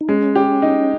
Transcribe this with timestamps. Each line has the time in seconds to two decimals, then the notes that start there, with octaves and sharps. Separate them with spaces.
0.01 D#4
0.09 G#3 C#4
0.36 G4
0.62 D#4